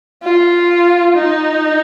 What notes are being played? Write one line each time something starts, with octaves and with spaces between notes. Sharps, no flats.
F4
D#4